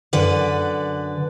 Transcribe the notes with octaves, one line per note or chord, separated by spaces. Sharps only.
F#2 D3 B4 D5